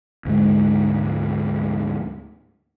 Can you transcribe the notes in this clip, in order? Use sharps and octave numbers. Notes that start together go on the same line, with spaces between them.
D2 G#2 G#3